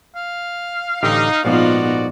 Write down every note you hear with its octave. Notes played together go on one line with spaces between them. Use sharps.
F5
A1 D3 D#4 G4
A#1 G#2 F3 B3 D#4 F4 F#4 D5